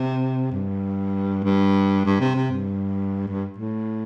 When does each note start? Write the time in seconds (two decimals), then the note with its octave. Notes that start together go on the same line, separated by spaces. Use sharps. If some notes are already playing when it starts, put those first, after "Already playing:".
Already playing: C3
0.52 G2
1.44 G2
2.05 G2
2.20 C3
2.36 C3
2.51 G2
3.28 G2
3.58 A2